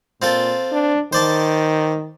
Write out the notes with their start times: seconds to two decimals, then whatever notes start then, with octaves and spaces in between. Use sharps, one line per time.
0.22 A#2 C4 F4 A4
0.72 D4
1.13 D#3 C5 D5 A5